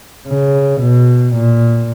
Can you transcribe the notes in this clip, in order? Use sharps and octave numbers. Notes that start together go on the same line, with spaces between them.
C#3
B2
A#2